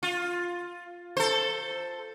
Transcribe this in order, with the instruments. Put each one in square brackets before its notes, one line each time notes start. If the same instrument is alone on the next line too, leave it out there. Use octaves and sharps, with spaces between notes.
[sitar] F4
A4 C5